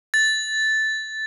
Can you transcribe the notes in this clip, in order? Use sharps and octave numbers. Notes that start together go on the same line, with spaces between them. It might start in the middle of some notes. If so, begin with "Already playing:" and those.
A6